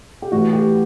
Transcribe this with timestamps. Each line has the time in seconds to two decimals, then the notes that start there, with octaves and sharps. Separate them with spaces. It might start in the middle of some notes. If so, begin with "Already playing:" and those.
0.22 G4
0.32 A2 E3 F#4
0.53 G4